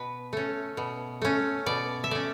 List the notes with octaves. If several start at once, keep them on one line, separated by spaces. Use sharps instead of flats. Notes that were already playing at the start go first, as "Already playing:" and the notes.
Already playing: B2 B4
A3 C#4
B2
A3 C#4
B2 D5
E5
A3 C#4 D5